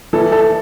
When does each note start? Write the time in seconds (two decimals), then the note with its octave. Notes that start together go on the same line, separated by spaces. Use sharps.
0.13 E3 A4
0.32 A4